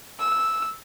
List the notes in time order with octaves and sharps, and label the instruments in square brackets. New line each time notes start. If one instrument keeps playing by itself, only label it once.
[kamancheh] E6